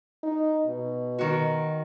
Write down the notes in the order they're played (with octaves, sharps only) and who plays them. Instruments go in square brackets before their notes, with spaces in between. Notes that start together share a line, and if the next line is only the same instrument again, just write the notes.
[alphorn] D#4
B2
[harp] D#3 F#4